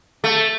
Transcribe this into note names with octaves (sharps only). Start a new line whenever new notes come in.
A3